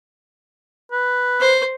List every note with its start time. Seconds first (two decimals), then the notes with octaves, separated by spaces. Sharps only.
0.92 B4
1.40 C5